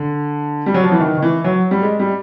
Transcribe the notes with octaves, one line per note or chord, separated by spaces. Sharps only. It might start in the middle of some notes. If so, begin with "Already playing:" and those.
Already playing: D3
G3
F#3
F3
E3
D#3
D#3
E3
F#3
G3
G#3
G3